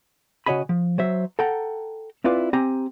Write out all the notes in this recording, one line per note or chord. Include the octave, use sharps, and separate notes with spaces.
C#3 F#4 C#5 D#5 G#5 B5
F3
F#3 C5 E5
A4 F#5 G5 A#5
C4 E4 F4 B4 D5 F5
C4 G4 G#5 A#5